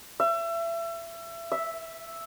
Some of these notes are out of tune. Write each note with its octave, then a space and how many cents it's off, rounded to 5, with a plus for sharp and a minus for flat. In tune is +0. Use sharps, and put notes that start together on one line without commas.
E5 +30
E5 -5